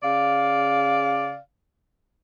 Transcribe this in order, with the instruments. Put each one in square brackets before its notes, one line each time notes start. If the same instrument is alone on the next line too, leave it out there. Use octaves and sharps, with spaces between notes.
[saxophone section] C#3 D5 F5